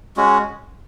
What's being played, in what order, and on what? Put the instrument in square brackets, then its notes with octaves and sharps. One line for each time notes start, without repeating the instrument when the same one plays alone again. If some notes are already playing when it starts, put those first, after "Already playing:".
[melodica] G#3 C#4 F#4